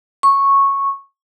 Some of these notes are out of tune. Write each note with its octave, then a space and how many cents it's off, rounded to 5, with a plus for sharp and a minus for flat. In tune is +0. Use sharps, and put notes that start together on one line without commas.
C#6 -10